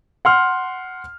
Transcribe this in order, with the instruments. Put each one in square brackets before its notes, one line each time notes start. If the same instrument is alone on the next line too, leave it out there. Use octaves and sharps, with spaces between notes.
[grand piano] F#5 C6 F6